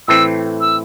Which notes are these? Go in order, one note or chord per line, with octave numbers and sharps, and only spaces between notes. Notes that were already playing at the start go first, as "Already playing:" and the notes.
A2 E3 A3 C4 E6
E6